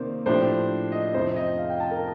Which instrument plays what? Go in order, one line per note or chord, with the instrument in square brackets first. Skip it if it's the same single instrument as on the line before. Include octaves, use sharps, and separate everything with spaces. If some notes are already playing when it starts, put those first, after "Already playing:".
Already playing: [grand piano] C3 D#3 A#3 [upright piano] C5 D5
[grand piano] A2 F3 A3 D4 G4 [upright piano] C5
[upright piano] D#5
[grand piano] F2 C3 F3 [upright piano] C5
[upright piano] D#5
F5
G5
A5
A#4